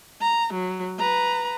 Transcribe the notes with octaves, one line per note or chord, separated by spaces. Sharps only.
A#5
F#3
B4 A#5